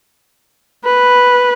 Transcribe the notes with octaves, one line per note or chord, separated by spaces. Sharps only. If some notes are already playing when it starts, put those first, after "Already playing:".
B4